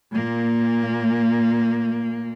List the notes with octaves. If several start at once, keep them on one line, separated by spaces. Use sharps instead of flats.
A#2 A#3